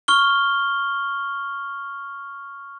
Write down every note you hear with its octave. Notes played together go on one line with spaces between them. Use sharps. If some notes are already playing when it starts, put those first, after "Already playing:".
C#6 F6 G7